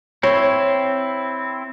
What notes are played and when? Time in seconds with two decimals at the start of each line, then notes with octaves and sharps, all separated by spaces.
0.23 C4 E4 C#5